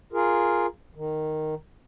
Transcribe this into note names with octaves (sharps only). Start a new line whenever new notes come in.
F4 G#4 A#4
D#3